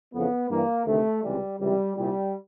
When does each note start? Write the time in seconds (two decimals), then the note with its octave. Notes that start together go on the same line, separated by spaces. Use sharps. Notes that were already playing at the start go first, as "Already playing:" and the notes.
0.13 F2 C#3 E3 B3
0.50 G2 E3 A#3
0.86 D2 C3 D#3 A3
1.23 C#2 C3 E3 G3
1.59 C#2 C3 E3 G3
1.96 C2 A#2 G3